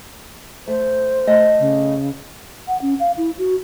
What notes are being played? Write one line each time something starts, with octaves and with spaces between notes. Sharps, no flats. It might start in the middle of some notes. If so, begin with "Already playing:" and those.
A3 C5
A3 D#5 G5
C#3
F#5
C#4
F5
E4
F#4